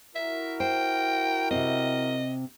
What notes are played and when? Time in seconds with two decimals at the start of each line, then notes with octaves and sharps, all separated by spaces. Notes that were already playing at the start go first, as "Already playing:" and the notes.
0.15 E4 F#4 A#4 E5
0.60 C5 G5
1.51 C3 C4 D#5